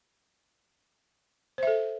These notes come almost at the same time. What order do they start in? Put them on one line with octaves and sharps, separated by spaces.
C5 E5 A4